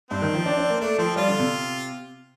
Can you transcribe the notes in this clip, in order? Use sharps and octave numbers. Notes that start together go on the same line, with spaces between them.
G2 C4
D#3
F3
D4
D4
A#3
A3 D4
F3 C4
G3 F4
D3
C3